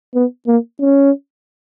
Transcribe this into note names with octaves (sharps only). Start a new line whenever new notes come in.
B3
A#3
C#4